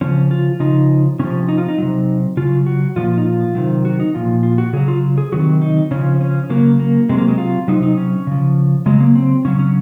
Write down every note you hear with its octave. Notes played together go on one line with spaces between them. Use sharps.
C#3 F3 C#4
F4
C#3 F3 D#4
C3 F3 C#4
D#4
F4
D#4
C3 F#3
C#3 F#3 F4
F#4
A#2 F3 F4
D#4
F4
C3 D#3 F#3
F#4
D#4
A#2 F3 F4
F4
F#4
C#3 F#3 G#4
F4
G#4
C3 D#3 F#3 F#4
D#4
C#3 F3 C#4
C#4
C#3 F#3 A#3
A#3
C3 F#3 G#3
A#3
G#3
F4
C3 F#3 D#4
D#4
C#4
C#3 F3
C#3 F#3 G#3
A#3
C4
C#3 F#3 C#4
C#4